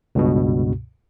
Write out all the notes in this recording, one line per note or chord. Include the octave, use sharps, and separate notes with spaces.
C#2 G2 B2